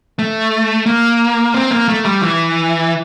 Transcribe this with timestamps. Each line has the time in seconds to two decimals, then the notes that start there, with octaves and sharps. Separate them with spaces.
0.19 A3
0.86 A#3
1.54 C4
1.71 A#3
1.88 A3
2.05 G3
2.22 E3